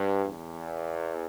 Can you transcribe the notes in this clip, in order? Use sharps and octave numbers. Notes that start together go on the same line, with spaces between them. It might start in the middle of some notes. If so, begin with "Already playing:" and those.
Already playing: G2
E2